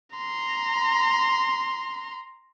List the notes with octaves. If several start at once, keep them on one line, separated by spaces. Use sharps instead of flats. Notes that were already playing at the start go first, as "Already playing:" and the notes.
A#5 C6